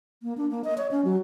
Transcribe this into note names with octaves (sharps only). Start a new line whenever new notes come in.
A#3
D4
A#3
D#5
C#5
C#4
F#3